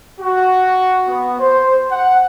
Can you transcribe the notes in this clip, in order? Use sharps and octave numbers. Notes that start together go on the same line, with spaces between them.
F#4
B3
C5
F#5